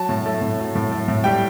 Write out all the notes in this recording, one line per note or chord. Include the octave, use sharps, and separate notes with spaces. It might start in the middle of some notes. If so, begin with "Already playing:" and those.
Already playing: F#3 A5
A2
A3
A2
F#3
A2
A3
A2
G3 G5